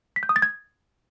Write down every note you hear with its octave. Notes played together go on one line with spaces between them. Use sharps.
B6
G6
D#6
A6
G#6